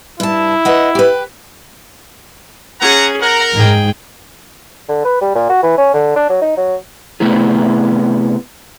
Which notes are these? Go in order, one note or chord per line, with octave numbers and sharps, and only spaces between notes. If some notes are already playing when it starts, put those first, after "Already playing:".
G2 E4 A5
B4 D#5 F#5
G4 B4
C#4 G#4 F#5 A#5
A#4 F#5 A#5
G#2 G#4 G5
D3
B4
G3
A#2
F#4
E3
C#4
D3
D4
F#3
D#4
F#3
C3 A3 B3 E4 G#4